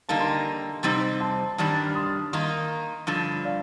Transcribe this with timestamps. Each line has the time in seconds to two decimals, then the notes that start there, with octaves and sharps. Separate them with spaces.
0.09 D3 G3 A#3 D#4 F5 A5
0.20 C6
0.27 G5 A#5
0.83 C3 G3 C4 D#4
1.20 A5 C6
1.58 G2 D#3 G3 D4 A5 C6
1.87 F6
1.95 C6 D#6
2.33 D#3 A#3 D#4 C6 D#6
3.07 G2 D3 F3
3.45 D5 F5